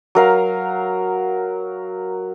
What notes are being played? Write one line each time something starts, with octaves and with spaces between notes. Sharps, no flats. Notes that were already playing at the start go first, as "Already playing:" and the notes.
F#3 A#4 F5